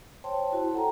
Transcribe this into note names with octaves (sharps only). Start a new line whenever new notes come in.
C5 C#5 G5 A5 C6
E4 F#4
A4 F#5 G5 A#5